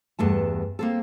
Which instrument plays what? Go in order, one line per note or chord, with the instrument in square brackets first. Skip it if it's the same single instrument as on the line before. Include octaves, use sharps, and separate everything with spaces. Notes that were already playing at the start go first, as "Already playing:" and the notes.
[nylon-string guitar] E2 G2 A3 A5
A#3 C4 A4